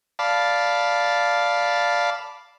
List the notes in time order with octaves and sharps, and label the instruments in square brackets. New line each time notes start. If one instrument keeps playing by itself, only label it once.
[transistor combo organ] D5 F5 A5 B5